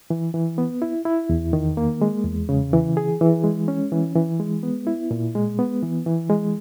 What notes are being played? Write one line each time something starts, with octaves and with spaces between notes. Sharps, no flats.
E3
E3
B3
E4
E4
E2
D#3
A#3
G#3
E2
C#3
E3
G#4
E3
G#3
C#4
E3
E3
G#3
B3
E4
A#2
G#3
B3
E3
E3
G#3